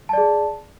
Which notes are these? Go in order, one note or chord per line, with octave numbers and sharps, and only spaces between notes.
G#4 D5 A5